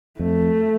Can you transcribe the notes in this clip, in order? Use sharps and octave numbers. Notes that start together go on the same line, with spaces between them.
F2 A3